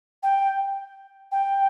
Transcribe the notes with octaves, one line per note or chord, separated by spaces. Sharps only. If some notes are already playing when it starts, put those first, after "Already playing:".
G5
G5